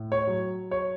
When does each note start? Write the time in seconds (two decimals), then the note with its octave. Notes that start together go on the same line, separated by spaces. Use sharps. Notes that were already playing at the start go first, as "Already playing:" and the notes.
Already playing: A2
0.12 C#5
0.27 F#3
0.71 C#5